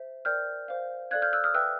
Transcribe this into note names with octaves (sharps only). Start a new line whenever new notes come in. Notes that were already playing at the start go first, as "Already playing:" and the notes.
Already playing: C5 E5
A#4 D5 G5 F6 G6
C5 F5
A4 D5 F5 F#6 G#6
F6 G6
E6 F#6
D#6 F6
B4 E5 G5 E6 F#6